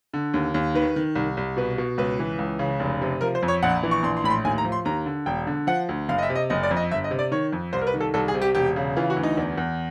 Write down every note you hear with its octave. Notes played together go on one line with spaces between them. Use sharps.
D3
D#2
D#2
D#3 B4
D#3
C2
C2
B2 B4
B2
C#2 B4
E3
C#2
C#3
F1
C3
F3 A#4
C5
F2
C#5
A#1 F#5
E3
C#6
A#1 C6
C6
A2 B5
C6
D#2 G#5
A#5
F3
C6
D#2 A#5
D3
E1 G5
D3
F3 F#5
D2
F#1 F5
D#5
E5
C3
D#5
F#1 D#5
D5
F2
D#5
G1 E5
D#5
C3
D5
D#3 C#5
F2
C2 C5
A#4
B4
D#3
A4
C2 A4
G#4
C3
G4
E1 G4
C#3
E3 F4
F#4
D2
D#4
E2
E2